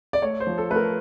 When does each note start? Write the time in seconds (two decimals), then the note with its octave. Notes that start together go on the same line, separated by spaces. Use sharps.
0.13 D5
0.22 A3 C#5
0.40 C5
0.47 F3
0.58 A4
0.70 A3 B4
0.76 A#4